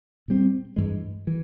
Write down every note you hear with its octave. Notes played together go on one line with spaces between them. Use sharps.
A#2 G3 C4
G2 E3 G#3
E3